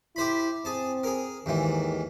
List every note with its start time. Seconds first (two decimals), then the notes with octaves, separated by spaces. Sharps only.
0.16 E4 G4 C5 B5
0.65 C4 G#4 A5
1.03 G#4 A#4
1.46 D#2 G#2 D#3 E3